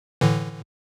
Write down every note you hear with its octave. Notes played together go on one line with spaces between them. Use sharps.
A2 D3 E3